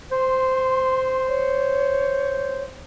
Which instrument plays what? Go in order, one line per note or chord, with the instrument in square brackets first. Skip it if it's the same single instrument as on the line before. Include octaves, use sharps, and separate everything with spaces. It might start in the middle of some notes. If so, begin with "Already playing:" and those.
[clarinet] C5 [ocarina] C6
[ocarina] C#5